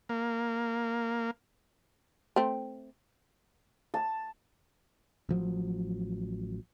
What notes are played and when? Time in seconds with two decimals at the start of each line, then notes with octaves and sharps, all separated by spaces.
0.09 A#3
2.36 A3 C4
3.94 A5
5.29 A1 F3 F#3